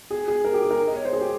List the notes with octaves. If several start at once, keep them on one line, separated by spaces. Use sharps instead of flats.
G#4
G#4
A#4
G4
G#4
A#4
D#5
C#5
C5
G#4
G4